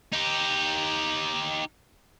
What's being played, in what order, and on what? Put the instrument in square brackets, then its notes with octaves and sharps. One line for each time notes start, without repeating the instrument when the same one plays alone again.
[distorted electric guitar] D#4 G4